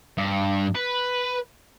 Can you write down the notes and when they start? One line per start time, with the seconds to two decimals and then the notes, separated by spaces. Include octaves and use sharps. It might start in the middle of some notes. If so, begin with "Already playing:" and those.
0.18 G2
0.75 B4